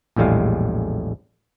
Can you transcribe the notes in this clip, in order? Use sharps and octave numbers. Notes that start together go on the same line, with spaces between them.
A#1 E2 A2 G3 G#3 F5